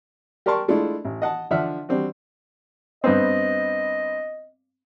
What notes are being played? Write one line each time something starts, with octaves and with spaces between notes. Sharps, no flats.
G4 A#4 D5 A5 C6 C#6
G#3 A3 D4 E4 F4
A1
D#5 F#5 A5
D3 F3 D4 E5 F#5 F6
G3 C4 D4 F#4
G2 B3 C4 D#5